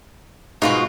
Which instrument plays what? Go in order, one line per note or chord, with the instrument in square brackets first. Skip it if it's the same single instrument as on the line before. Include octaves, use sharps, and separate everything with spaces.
[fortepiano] G#2 [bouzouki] B2 F4 F#4